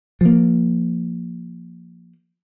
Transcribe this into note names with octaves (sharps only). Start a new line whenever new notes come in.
F3 A#3